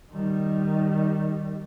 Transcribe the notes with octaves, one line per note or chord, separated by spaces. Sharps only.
D#3 G3